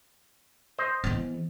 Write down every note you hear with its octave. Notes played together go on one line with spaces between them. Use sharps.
C5 D#5
E3 B3